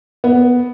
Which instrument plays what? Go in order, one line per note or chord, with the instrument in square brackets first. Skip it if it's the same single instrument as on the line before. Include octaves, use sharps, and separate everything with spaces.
[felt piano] B3